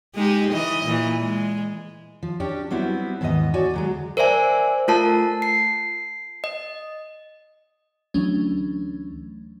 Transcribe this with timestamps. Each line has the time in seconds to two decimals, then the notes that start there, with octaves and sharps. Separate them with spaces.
0.15 G#3 D#4 G4
0.51 E3 D#5
0.86 A#2 E3
1.19 G#3
2.23 F3
2.40 C#4 D4 G4
2.70 F#3 G3 B3 C4 E4
3.21 D#2 G#2 E3 B3 D#5
3.54 F#4 C#5 D5 G#5
3.74 D2 F#3 G#3
4.17 A#4 C5 D5 E5 G#5
4.88 A3 F4 A#4 A5
5.42 C7
6.44 D#5
8.14 D2 E3 F#3 A3 C#4 D4